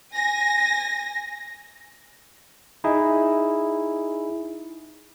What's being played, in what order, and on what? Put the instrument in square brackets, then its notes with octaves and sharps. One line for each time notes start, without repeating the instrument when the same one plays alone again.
[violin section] G#5 A#6
[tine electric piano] D#4 E4 G#4